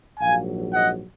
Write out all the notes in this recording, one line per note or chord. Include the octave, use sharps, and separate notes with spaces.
A#1 G#2 F#3 F5 G#5
D#5 F#5